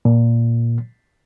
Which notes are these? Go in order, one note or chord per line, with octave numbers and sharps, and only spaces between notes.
A#2